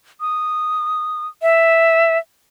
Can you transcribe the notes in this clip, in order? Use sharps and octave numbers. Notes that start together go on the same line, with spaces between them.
D#6
E5